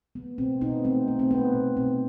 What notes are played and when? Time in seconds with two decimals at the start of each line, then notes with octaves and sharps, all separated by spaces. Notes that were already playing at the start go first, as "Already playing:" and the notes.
0.15 A3 B3
0.38 B2 C4
0.61 B2 B3 D#4
0.84 A3 C4
1.08 A3
1.19 C4
1.30 A3 B3
1.53 B2
1.77 B2 C4